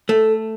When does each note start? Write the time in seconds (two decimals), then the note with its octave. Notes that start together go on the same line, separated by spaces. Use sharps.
0.09 A3 A4